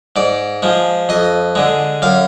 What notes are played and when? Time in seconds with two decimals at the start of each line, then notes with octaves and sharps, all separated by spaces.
0.16 G#2 D5
0.62 F3 G#3
1.09 F2 D#5
1.55 D3 G#3
2.02 F#2 F5